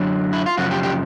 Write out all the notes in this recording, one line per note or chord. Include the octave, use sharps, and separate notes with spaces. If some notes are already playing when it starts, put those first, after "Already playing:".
Already playing: F#2 D3 F#3
E4
F4
F#2 C#3 F3 F#4
G4
G4